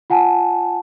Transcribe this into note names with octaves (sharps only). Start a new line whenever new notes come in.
F4 F#5 G#5 A5